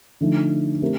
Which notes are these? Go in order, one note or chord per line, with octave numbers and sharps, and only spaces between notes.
D3 F3 A3 D#4
A3 C4 G4 A#4